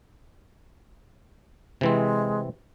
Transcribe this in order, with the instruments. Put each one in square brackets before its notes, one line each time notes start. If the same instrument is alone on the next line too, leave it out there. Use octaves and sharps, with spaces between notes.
[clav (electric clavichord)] C3 E3 C4 [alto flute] G#3